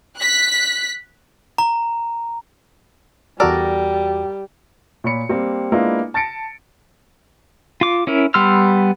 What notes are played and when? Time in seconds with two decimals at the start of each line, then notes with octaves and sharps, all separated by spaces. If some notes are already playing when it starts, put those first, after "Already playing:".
0.17 F#6 B6
1.58 A#5
3.40 E2 G3 F#4 A4 A#4 D5 D6
5.04 A#2 C#5 B5 C#7
5.29 G3 A#3 C4
5.72 G#3 A#3 B3 D4 E4 F4
6.14 A5 A6 A#6 C#7 D7
7.81 F4 D6
8.07 C#4 E4 A#4
8.34 G3 B3 C6 E6 F6